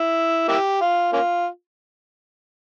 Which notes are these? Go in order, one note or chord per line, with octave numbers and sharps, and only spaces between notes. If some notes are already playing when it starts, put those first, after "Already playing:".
Already playing: E4
A#3 E4 G4
F4
A#3 C#4 F4